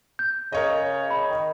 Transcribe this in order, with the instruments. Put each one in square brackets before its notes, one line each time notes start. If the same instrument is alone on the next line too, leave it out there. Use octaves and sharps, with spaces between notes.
[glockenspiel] G6
[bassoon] C#3 [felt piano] A#4 C#5 D#5
[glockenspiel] B5
[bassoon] D#3